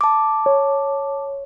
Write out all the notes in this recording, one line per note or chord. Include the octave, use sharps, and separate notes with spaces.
A5 D6
C#5